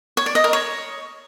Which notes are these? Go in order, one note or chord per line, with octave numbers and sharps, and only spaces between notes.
C#5
D5
D#5
A#4
C#5